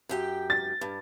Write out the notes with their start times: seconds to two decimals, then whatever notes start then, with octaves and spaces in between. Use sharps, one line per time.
0.09 F#2 G4 G5
0.50 A6
0.81 G2